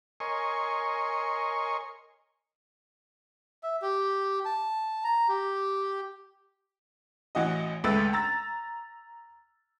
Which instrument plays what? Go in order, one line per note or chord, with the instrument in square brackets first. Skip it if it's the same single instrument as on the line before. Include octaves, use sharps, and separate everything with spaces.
[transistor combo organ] A#4 C#5 D#5 G#5 C6 C#6
[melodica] E5
G4
A5
A#5
G4
[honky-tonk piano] A1 E3 F#4 D#5
G#1 C#2 A3 B4 E6 A6
A#5 E6 A6